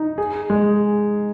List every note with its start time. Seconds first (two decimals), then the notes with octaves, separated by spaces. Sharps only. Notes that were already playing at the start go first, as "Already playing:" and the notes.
Already playing: D#4
0.18 G#4
0.50 G#3